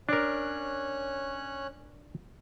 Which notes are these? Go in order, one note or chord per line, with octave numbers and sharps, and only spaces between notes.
C#4 D4 A#4 C#5 F#6